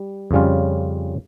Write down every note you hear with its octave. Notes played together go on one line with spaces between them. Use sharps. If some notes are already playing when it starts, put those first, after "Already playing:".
Already playing: G3
F2 C#3 G3 C#4 F4